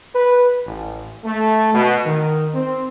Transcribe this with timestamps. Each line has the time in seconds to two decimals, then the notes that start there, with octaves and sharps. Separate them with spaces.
0.14 B4
0.67 A1
1.25 A3
1.75 B2
2.05 D#3
2.54 C4